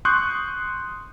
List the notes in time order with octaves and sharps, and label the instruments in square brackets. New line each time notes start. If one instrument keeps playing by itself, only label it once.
[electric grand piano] C6 C#6 D#6 F#6 G6